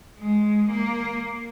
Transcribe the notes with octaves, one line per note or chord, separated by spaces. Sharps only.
G#3
A#3